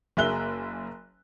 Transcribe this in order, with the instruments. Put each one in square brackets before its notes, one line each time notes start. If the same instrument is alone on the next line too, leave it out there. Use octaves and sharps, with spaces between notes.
[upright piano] F#1 A#3 G#4 E5 F#6 G7